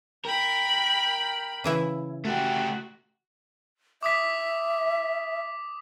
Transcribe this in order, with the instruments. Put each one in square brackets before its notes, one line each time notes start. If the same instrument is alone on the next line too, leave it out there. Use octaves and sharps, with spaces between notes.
[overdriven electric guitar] A#4 [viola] G5 B5
[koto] C#3 E3 E4
[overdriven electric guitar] A3 G4 [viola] F#4
[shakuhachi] E5 [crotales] D6 D#6 B6